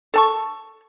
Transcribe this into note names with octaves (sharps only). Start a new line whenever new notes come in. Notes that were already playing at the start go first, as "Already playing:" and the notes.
A4 A5 C#6